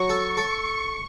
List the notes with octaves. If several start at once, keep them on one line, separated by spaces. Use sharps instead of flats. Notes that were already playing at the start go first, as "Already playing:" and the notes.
Already playing: F#3 C#6
A4
A4